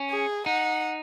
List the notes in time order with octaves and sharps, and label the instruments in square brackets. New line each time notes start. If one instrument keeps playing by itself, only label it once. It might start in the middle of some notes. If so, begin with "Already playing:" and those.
Already playing: [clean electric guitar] C#4
[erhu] G#4
[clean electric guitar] D#4 [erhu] F#5